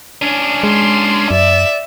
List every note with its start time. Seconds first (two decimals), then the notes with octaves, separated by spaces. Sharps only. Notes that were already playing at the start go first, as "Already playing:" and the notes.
0.22 C#4 D4
0.63 G#3 C6
1.31 F#2 D5 E5